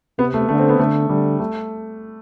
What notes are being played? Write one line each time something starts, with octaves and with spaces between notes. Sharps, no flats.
C3 B3
A3
D3 A3
C4
B3
D3 A3
D3 G3
A3